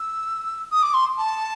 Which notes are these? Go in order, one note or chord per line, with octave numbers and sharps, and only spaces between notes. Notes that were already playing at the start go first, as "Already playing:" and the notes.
Already playing: E6
D#6
D6
C6
A5